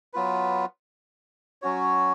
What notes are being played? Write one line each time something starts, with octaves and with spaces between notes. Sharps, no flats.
F#3 B3 F4 B4
F#3 C#4 F#4 C#5